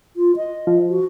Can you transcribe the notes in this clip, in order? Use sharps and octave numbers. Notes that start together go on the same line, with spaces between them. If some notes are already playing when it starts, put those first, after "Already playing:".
F4
D#5
F3
F#4